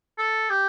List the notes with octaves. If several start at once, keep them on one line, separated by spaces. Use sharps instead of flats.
A4
G4